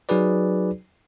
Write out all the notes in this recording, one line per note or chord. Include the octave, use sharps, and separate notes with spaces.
F#3 D#4 F#4 G#4 B4 D5